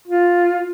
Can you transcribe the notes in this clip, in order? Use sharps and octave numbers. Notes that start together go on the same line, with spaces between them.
F4